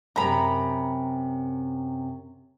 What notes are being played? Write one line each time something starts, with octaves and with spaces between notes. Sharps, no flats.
F#2 A2 C3 A#5 B5